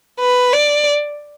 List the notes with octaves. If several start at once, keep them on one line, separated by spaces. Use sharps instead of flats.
B4
D5